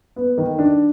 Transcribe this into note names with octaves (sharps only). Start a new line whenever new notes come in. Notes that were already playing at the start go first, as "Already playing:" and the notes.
B3
D#3
D4